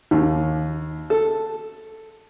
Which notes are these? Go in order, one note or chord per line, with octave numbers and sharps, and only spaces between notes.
D#2
A4